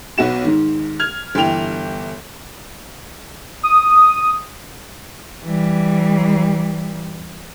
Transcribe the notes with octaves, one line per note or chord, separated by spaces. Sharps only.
B1 B3 F#4 E7
G#2 D#3
F6 G#6 F7
G1 E3 G5 F7
D#6
E3 G3